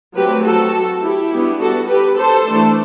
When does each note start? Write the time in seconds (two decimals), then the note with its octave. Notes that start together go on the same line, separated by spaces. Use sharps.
0.16 F#3 A3 C4 G4 B4
0.45 F#4 A4
1.03 E4 G4
1.31 G3 B3 D4
1.60 F#4 A4
1.89 G4 B4
2.18 A4 C5
2.47 E3 A3 D4